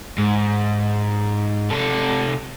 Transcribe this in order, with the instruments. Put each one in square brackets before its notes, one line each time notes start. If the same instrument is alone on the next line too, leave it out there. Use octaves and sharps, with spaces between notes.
[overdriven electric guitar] G#2
C3 A4